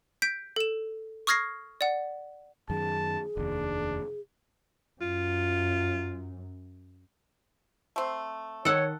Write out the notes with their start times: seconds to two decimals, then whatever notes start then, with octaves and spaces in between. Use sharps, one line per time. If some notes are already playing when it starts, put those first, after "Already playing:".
0.22 G6 B6 D7
0.56 A4 E7
1.27 C#6 D#6 F6 G#6 A#6 C7
1.81 D5 F#5
2.70 F#2 D#3 G#4 A5
3.37 F1 D#2 D4
5.01 F#2 F4
7.96 A3 C4
8.65 D#3 A4 C#5 F#5